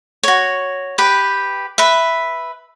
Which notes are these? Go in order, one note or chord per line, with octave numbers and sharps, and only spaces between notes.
F#4 C#5
G4 B4 G5
B4 E5